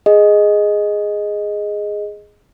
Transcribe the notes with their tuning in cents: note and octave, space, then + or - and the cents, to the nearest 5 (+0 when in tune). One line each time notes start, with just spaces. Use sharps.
G#4 +0 D#5 +0